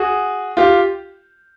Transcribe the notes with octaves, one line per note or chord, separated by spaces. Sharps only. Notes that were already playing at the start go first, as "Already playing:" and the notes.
Already playing: F#4 G#4
F4 G4